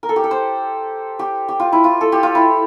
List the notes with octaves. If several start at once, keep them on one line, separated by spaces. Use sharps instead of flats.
A#4
A4
G4
A4
C5
G4
G4
F4
E4
F4
A4
G4
F4
E4